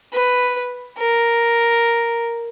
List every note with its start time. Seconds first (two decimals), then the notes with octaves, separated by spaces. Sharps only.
0.14 B4
0.98 A#4